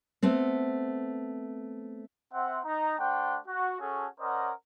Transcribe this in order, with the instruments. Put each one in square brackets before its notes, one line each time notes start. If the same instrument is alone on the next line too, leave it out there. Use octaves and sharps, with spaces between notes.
[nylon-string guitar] A3 B3 C4
[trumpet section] C4 E5 F#5
D#4 A#5
A3 D4 C5 F#5 G5
F#4
C#4 F#4 G#4 A4
C#4 A#4 C5 D5 D#5 F#5